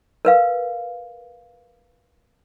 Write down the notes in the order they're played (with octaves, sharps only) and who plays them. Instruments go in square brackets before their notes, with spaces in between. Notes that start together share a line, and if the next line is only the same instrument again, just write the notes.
[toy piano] A#4 B4 F5